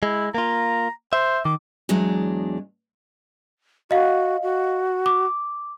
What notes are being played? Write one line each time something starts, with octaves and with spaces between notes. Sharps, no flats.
G#3 E4
A#3 F4 A#5
C5 E5
D#3 D6
E2 F#3 G#3 D4
F#4 D#5 F5
F#4
D6